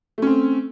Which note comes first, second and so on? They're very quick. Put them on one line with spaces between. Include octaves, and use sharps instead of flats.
A3 C#4 C4